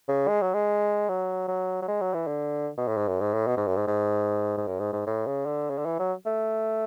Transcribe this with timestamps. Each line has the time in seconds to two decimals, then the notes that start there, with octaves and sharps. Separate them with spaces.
0.09 C#3
0.28 G#3
0.41 F#3
0.54 G#3
1.09 F#3
1.48 F#3
1.82 F#3
1.88 G#3
2.01 F#3
2.14 E3
2.27 D3
2.78 B2
2.88 A2
2.97 G#2
3.08 F#2
3.21 G#2
3.34 A2
3.47 B2
3.57 G#2
3.67 F#2
3.77 G#2
3.87 G#2
4.58 G#2
4.67 F#2
4.80 G#2
4.93 G#2
5.07 A2
5.26 C#3
5.46 D3
5.70 C#3
5.78 D3
5.86 E3
5.99 F#3
6.26 A3